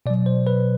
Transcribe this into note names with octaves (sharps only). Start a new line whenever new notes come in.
B2 F#3 D5
C5
B4